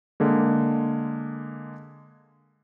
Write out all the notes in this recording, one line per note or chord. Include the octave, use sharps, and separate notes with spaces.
D3 G#3 A#3